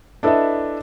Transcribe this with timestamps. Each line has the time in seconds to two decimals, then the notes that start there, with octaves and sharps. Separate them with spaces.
0.23 D4 E4 A4 B4 D#5 E5